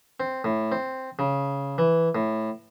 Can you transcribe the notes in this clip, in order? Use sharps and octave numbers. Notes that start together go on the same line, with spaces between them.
C4
A2
C4
C#3
E3
A2